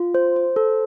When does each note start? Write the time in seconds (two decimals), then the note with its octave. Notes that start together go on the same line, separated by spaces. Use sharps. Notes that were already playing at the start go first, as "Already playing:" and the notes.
Already playing: F4
0.14 C5
0.36 C5
0.56 A4